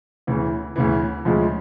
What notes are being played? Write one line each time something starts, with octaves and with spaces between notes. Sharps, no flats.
D2 C#3 E3
D2 C#3 E3
D2 C#3 F3 G#3